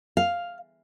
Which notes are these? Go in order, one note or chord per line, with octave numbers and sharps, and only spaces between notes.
F5